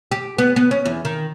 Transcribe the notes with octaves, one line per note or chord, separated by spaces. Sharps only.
G4
B3
B3
C#4
E2
D#3